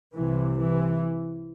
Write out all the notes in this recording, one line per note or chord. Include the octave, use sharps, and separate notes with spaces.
C2 C3 E3
E3